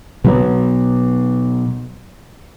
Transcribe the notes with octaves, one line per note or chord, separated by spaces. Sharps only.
B2 F#3 B3